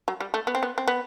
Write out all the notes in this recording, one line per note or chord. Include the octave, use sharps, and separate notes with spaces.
F#3
G3
A3
B3
C4
B3
C4
B3